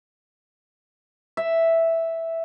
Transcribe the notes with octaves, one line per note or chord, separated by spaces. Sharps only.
E5